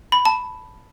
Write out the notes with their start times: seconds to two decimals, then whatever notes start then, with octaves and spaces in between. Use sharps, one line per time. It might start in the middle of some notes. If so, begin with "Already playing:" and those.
0.12 B5
0.25 A5